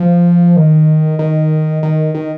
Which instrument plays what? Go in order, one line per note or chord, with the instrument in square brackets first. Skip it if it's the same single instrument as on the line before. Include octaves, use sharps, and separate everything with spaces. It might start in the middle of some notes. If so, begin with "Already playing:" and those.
Already playing: [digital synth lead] F3
D#3
D#3
D#3
D#3